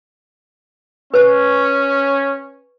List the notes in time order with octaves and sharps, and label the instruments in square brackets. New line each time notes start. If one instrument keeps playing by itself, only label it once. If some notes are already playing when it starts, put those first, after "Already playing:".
[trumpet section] C#4 [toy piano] B4 C5